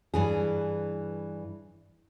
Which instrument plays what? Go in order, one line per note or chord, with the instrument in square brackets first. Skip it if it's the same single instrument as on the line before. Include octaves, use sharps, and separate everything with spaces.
[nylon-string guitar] G2 E3 G#4